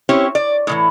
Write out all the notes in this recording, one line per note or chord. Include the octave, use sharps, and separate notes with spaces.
C4 C#4 E4 G4 C#5
D5
A2 D#3 E3